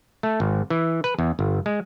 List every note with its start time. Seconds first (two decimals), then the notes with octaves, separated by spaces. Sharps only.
0.23 A3
0.40 G#1
0.70 E3
1.04 B4
1.19 E2
1.39 G1
1.66 G#3